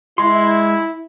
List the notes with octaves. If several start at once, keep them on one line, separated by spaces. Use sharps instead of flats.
G#3 E4 C6